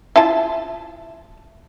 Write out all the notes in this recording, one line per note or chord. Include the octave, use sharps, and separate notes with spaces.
E4 F4 A5